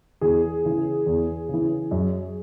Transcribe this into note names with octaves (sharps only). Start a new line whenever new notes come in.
E2 G#4
C#3 E3
E2
C#3 E3
F#2